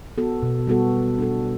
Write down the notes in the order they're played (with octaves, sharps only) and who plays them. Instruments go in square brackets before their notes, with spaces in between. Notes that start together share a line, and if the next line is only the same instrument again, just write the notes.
[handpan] B3 F#4 A4
B2
G3 B3 F#4 A4
G3
D4 A4